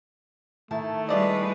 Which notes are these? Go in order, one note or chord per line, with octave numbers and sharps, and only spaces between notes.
D#3 A3 E4 A5
G3 G#3 F4 B4 D5 D#5